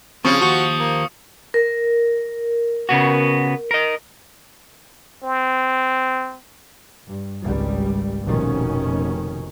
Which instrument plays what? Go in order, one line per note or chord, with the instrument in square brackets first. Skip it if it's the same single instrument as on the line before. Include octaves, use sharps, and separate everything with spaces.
[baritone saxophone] C#3 [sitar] F3 [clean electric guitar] C4 G4 G#4 [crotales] C#6 D#6 C#7
[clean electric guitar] D#2 G4 A5 [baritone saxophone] F#4
[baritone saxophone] A#3
[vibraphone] A#4
[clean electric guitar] C#3 B3 F#4
A#4 D#5
[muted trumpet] C4
[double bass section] G2
G#1 C#2 G3
F1 A#1 F2 B2 D#3 C#4